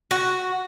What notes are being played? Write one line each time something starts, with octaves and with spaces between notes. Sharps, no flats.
F#4